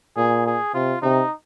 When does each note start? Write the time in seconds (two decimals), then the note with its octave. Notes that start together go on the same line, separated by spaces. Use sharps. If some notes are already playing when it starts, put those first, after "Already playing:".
0.16 A#2 G#4
0.46 G#4
0.74 C3 F4
1.02 C3 D#4